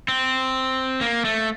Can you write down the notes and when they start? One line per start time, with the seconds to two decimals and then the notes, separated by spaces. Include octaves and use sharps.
0.08 C4
1.01 A#3
1.25 A3